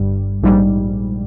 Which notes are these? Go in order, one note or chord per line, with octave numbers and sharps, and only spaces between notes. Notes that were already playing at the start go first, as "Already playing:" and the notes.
Already playing: G1 G2 G3
A#1 G#2 G3